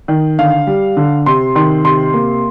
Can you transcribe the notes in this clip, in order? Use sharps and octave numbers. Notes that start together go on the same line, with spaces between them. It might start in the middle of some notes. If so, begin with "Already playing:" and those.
D#3
D3 F5
G3
D3
C3 C6
D#3 C6
C3 C6
A#3